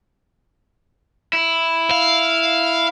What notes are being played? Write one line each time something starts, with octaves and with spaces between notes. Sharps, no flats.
E4
F5